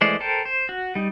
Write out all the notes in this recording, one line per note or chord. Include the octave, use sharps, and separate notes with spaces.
E3 G#3 A3 C5 D5
A4 A#4 C5 G5
C5
F#4
G3 D#4